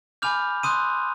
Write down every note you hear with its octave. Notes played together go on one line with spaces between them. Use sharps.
G#5 B5 D6 F6 G6 F7
C6 D#6 F#6 D#7